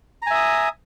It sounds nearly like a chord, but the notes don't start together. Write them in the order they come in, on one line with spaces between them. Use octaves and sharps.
A#5 G#5 E5 D#6